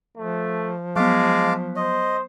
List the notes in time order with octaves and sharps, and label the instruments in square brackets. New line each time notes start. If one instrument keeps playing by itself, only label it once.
[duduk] F3 [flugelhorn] A3
[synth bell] F#3 B3 [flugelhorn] G#3 [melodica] F5 A5 D6
[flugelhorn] C5 [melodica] D#5